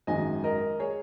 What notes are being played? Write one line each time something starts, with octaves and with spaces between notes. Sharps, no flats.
G#1 F#2 D#3 G#3 D#5 G#5
A#4 D#5
G#4 C#5